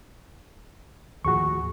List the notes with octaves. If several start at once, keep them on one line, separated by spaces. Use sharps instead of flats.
D#2 A2 F3 F#4 G#4 C#6